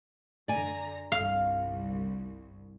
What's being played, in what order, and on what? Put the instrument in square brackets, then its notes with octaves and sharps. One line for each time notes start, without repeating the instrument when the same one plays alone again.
[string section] F#2 D3 A#5 [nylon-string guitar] D5 G#5
[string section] G1 C2 [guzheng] F5